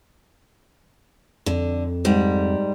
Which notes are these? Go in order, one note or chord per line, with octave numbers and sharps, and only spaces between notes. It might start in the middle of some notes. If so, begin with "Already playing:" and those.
F2 D3
G#2 G3